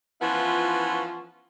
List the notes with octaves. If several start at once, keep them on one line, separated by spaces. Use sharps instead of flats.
E3 F3 B3 C#4 E4 F4